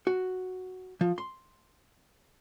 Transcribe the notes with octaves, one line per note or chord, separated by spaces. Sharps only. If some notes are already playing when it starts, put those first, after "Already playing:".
F#4
F3
C6